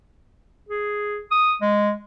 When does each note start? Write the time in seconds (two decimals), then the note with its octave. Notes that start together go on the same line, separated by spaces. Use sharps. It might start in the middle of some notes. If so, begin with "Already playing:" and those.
0.69 G#4
1.32 D#6
1.62 G#3